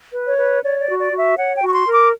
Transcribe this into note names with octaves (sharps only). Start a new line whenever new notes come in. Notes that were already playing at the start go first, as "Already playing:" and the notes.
B4
C#5
B4
C#5 D5
D5
F#4
D5
F#4
E5
C#5 F#5
G5
F#4
C#6
C6
A#4
D6